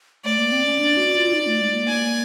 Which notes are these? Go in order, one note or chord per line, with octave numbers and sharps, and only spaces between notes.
A3 D5
A#3
C4
C#4
D4
F#4
F4
D#4
A3
G#3
A#3
G#5